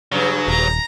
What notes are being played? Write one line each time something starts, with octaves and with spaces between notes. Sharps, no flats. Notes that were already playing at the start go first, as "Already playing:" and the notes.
G2 C#3 F#3
D#1 A#5